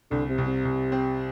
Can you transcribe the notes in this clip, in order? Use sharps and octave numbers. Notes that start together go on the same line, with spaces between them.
C2 D3
C3
C2
C3
C2
C4